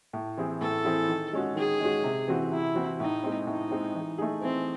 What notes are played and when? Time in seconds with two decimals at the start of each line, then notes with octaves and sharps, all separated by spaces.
0.13 A2
0.37 E3 C4 E4 G#4
0.61 A2 A4
0.85 E3 C4 E4 G#4
1.09 D#3
1.33 G#3 C#4 F#4
1.56 D#3 G#4
1.80 G#3 C#4 F#4
2.04 C3
2.28 E3 C4 F#4
2.52 C3 E4
2.76 E3 C4 F#4
3.00 A2 D#4
3.24 G#3 C4
3.47 A2 D#4
3.71 G#3 C4
3.95 E3
4.18 A3 D#4 G#4
4.42 E3 C4